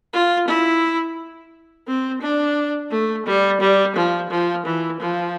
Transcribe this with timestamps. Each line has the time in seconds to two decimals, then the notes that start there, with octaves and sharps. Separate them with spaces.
0.13 F4
0.47 E4
1.87 C4
2.21 D4
2.91 A3
3.26 G3
3.60 G3
3.95 F3
4.30 F3
4.65 E3
5.00 F3